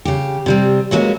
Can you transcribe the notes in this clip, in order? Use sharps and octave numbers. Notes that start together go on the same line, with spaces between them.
C#3 G4
C3 G3 C4
E3 F#3 G#3 A#3 C#4